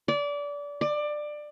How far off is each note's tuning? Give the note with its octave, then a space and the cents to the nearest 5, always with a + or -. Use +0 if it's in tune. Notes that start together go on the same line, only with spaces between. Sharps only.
D5 -25
D5 +20